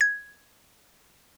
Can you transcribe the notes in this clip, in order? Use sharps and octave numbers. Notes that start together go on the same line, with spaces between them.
G#6